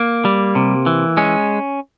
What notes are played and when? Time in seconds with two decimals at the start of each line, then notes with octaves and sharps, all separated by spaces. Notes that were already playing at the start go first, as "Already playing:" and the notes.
Already playing: A#3
0.25 G3
0.55 C3
0.86 E3
1.17 G#3 C#4